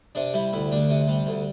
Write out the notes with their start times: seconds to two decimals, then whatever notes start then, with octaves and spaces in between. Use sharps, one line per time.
0.15 C3 D4
0.34 G3 E4
0.53 D2 E4
0.72 D2 D4
0.90 C3
1.08 G3
1.27 D2